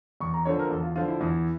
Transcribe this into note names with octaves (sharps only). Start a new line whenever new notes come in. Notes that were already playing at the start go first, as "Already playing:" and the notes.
E2 C#6
A#5
D3 F3 C#5
A#4
E2 A4
F4
D3 F3 F4
E4
E2 E4